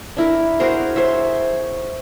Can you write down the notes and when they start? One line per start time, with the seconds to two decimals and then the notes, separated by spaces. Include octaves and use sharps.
0.17 D4 E4 A#4
0.60 F#4 G#4 A#4 C5
0.96 C5 C#5 E5